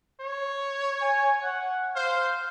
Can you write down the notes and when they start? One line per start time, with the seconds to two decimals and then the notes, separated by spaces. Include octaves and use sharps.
0.21 C#5
1.02 G#5
1.44 F#5
1.96 C5 F5